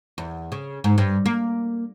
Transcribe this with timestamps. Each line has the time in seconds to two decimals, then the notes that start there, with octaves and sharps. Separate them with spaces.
0.18 E2
0.52 C#3
0.84 G#2
0.98 G2
1.26 A#3